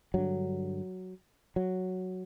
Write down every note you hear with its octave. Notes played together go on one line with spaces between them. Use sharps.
G2 D3 F#3
F#3